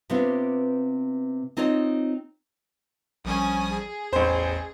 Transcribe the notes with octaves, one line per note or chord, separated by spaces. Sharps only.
C3 B3 C4 D4 F4
C4 D#4 F4 C#5 D#5
A#1 F3 G3 C#4 G#5 D#6
G#4
A1 E2 C5